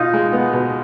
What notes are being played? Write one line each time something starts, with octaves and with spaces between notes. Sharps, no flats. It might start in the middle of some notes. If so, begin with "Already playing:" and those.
Already playing: B2 D#4 F4
G#3
B3
B2